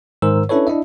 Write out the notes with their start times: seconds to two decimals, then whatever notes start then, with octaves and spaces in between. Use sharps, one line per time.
0.22 G#2 D#3 A#4 C5 E6
0.49 C#4 D4 E4 A4 B4 C#5
0.67 D4 E4 D#5 E5